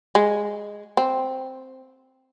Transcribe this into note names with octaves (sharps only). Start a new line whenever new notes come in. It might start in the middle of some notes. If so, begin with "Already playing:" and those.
G#3
C4